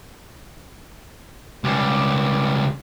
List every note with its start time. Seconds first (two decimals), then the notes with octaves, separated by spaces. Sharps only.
1.64 C#2 G3